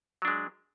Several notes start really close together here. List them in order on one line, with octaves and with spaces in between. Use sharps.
F#3 D4 G#3